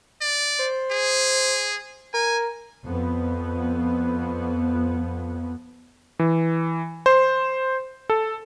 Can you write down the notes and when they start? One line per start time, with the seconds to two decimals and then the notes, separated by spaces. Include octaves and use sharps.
0.22 D5
0.59 C5
0.91 G#4
2.14 A#4 G#5
2.84 F2 B3
6.19 E3
7.06 C5
8.10 A4